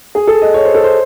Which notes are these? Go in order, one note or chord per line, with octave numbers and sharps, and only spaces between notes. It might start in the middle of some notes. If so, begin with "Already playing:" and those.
G#4
A4
D#5
C#5
C5
A4
C5